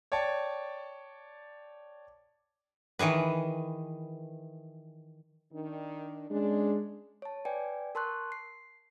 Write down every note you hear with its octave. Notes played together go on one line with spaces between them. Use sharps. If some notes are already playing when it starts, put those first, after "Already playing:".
C#5 D5 G5 A5
D#3 E3 G#4 B4
D#3 D4
G#3 C#4 D4
C#5 A5
B4 D5 G5 G#5
A#4 A5 C6 C#6 F#6
C7